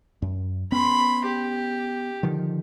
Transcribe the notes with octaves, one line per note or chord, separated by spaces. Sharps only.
F#2
B3 C#4 B5 C6
G4
D3 D#3 F3